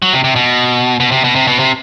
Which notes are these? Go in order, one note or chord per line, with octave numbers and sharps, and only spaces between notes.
F#3
C3
C3
B2
B2
C3
B2
C3
B2
C3